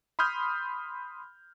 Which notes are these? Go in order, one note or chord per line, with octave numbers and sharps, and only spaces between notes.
B5 C6 D#6 F6 G6